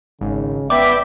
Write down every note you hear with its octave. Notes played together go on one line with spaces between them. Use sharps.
G#1 C#3
B3 D5 E5 G5 B5 D6